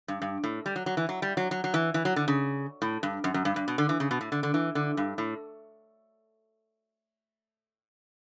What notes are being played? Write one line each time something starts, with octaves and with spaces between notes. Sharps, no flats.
G2
G2
A2
G3
F#3
F#3
E3
F#3
G3
F#3
F#3
F#3
E3
E3
F#3
D3
C#3
A2
G2
F#2
F#2
G2
G2
B2
D3
E3
C#3
B2
A2
D3
D3
E3
D3
G2
A2